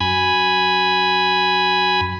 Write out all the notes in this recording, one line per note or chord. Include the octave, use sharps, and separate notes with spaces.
F#2 G#5 B5